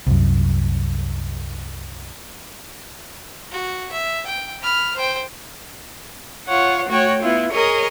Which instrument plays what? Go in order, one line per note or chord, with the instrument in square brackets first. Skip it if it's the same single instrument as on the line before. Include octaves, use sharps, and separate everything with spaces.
[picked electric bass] C2 F#2
[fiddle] F#4
E5
G5
B5 F6
C5 G5
[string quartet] F4 C#5 F#5
A3 F#4 C#5 G5
B3 E4 F4
G#4 A#4 C#5 D#5